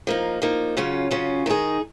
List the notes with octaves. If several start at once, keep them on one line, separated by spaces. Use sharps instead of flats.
F3 A#3 D#4
F3 A#3 D#4
C#3 F#3 C#4 F4
C#3 F#3 C#4 F4
D#3 G#3 D#4 G#4